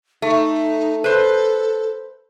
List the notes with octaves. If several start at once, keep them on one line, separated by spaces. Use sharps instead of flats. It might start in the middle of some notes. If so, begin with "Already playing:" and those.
A3 D#4
A4 B4 C5